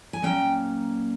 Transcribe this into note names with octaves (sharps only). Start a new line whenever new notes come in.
G#5
A#2 F#3 A#3 C#4 G5